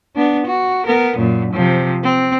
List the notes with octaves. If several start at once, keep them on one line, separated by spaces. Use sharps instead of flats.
B3 D4
F#4
B3 A#4
F#2 A#2
C3 F3
C4